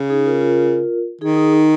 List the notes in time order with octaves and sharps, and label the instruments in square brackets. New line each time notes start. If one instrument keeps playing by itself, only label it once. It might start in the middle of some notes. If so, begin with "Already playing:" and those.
Already playing: [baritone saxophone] C#3
[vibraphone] D#4 G#4
F4 A#4
F4 A#4
[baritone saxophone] D#3 [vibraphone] D#4 G#4
[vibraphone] D#4 G#4
D#4